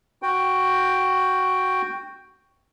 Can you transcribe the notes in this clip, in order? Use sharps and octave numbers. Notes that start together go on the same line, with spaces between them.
F#4 G5